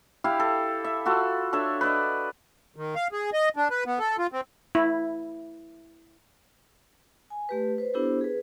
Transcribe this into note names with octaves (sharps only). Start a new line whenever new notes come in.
E4 G4 F5
A4
E5
F4 F#4 A4
D4 A4 C#5 E5
B4 D5 D#5
D#3
F5
G#4
D#5
D4
B4
B3
A4
F4
C4
E4
G#5
A3 G4 B4
B4 C5
B3 D4 E4 G4 A4 C5
G#4 B4